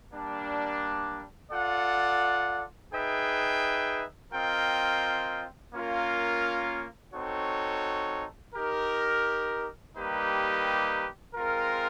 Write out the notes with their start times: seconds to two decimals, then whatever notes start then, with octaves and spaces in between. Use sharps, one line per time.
0.11 G3 A#3 D4
1.52 F4 A4 D5 F#5
2.92 D#4 G#4 B4 E5 G5
4.33 C4 F4 A#4 D#5 G5
5.73 A#3 C#4 F4 A#4
7.14 C4 D#4 F#4 A4 C#5
8.54 D#4 G4 A#4
9.95 G3 A#3 D#4 G4 B4
11.35 G#3 C4 F4 A#4